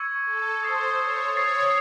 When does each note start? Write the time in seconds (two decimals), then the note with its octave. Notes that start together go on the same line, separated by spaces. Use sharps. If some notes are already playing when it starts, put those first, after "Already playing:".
Already playing: C#6 E6 G#6 C#7
0.25 A4
0.62 C5 D#6 A6 C7
0.99 C#5
1.36 C#5 D#6 A6 C7